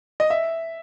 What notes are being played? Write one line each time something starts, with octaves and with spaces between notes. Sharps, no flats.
D#5
E5